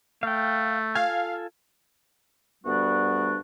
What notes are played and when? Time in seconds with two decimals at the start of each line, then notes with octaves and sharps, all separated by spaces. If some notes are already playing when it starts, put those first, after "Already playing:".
0.23 A3 F5 G5
0.95 F4 A4 F5 G#5
2.64 D2 G2 G3 B3 D4 F#4